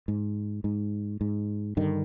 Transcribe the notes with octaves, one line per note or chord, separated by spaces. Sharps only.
G#2
G#2
G#2
G2 D3 D#3